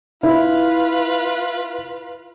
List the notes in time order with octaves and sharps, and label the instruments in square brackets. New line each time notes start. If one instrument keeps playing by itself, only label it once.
[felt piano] E4 [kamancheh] F4 B4